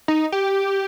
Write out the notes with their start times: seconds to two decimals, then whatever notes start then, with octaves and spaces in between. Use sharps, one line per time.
0.08 D#4
0.32 G4